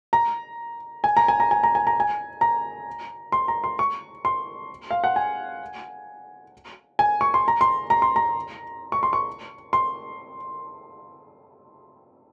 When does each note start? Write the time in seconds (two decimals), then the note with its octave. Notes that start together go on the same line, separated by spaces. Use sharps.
0.13 A#5
1.04 G#5
1.17 A#5
1.28 G#5
1.40 A#5
1.51 G#5
1.63 A#5
1.75 G#5
1.87 A#5
2.00 G#5
2.41 A#5
3.32 C6
3.48 A#5
3.64 C6
3.79 C#6
4.25 C6
4.91 F5
5.04 F#5
5.16 G#5
6.99 G#5
7.21 C#6
7.34 C6
7.48 A#5
7.61 C6
7.90 A#5
8.02 C6
8.16 A#5
8.92 C#6
9.03 C6
9.13 C#6
9.73 C6